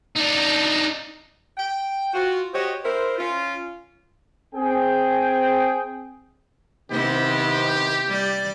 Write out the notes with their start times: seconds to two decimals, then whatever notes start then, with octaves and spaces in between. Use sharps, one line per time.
0.16 D4 D#4
1.58 G5
2.13 F4 F#4
2.53 F#4 G4 C5 C#5 D#5
2.84 E4 A#4 C5
3.18 C#4 F4
4.55 C4 G#4 G5
6.91 C3 D#3 B3 C4 E4 G4 D#5
8.08 G3 D5